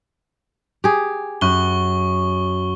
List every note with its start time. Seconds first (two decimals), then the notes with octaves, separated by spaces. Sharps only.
0.84 G4 G#4
1.41 F#2 C#4 C#6 F#6 G7